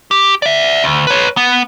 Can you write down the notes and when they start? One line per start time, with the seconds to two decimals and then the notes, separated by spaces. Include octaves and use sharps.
0.11 G4
0.42 D5 E5
0.84 D2
1.07 B4 C#5
1.37 B3